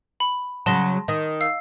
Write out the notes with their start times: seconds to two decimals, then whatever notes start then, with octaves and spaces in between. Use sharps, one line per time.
0.20 B5
0.66 C#3 F#3 A5 C6 A#6
1.08 D#3 D#5
1.41 F5 E6 C7